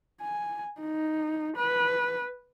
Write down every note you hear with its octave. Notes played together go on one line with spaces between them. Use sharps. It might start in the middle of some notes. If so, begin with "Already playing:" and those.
G#5
D#4
B4